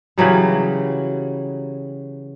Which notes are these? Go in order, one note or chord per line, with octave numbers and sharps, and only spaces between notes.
C#3 E3 F#3 G3